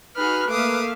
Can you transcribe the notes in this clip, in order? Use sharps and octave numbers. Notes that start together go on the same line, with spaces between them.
D#4 F#4 G#4 B4 B5 F6
A3 A#3 E5 F5 D6 D#6